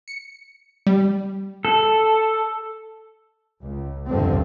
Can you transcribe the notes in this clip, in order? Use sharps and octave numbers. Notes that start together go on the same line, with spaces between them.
C#7
G3
A4
C#2
F1 C#2 G2 D3 D#3 C4